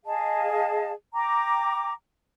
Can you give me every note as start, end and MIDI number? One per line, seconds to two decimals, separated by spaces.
0.05 0.91 68
0.05 0.91 75
0.05 0.91 77
0.05 0.91 81
1.14 1.92 79
1.14 1.92 82
1.14 1.92 86